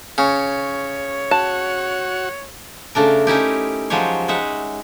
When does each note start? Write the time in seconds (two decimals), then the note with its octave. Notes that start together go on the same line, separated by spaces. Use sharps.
0.18 C#3 C#5
1.31 F#4 A5
2.95 C#3 A3 D4 A#4
3.27 C#4 D#4 E4 G4
3.90 F3 F#3 G#3 G4 C#5
4.28 G#3 D#4 E5 F#5